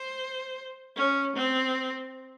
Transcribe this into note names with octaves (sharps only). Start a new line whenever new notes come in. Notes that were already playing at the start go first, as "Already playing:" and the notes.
Already playing: C5
C#4
C4